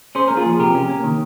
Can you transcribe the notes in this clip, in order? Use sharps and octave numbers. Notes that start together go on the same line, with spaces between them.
C#4 G#4 C5
A#3 A#4
F4 G#4
F3
C3 G4 A#4
C#4
A#3
D#3